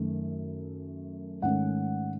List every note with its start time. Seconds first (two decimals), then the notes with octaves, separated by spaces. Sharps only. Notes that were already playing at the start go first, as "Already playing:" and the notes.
Already playing: F#2 D#3 A3
1.42 G#2 D#3 A3 C#4 F#5